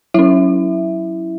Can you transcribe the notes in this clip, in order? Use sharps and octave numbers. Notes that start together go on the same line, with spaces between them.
F#3 C#4 E4 E5